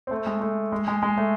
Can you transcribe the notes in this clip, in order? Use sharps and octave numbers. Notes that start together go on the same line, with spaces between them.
C4
A3
G#3
A3
G#3
G#3
G#3
A3